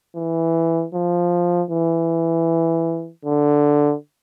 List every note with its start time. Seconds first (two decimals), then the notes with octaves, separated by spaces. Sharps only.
0.16 E3
0.94 F3
1.71 E3
3.25 D3